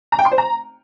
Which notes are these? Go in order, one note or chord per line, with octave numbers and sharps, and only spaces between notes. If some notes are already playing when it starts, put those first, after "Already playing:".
A#5
G5
C6
C5
A#5